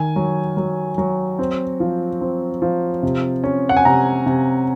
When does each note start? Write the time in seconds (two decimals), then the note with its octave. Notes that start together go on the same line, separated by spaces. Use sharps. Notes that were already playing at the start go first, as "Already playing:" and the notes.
Already playing: D#3 G#5
0.16 F#3
0.57 F#3
0.98 F#3
1.39 C4
1.80 F3
2.21 C4
2.62 F3
3.03 C3
3.44 C#4
3.69 F#5
3.77 G#5
3.85 C3 A#5
4.26 C3